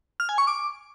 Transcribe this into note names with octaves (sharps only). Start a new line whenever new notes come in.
F6
G#5
C#6
D6